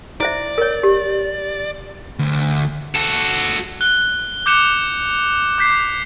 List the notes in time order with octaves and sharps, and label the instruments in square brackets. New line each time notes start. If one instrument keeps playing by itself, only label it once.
[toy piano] E4 C5 E5 [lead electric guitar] D5
[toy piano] A#4 C#5
G4
[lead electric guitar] D2
[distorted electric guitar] F#4 A4
[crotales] F#6 G7
D6 F#6 G6 C#7 E7 F7
D6 G6 B6 C7